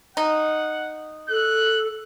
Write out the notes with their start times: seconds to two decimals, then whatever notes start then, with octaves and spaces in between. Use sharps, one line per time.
0.17 D#4 F#5
1.29 A4 F#6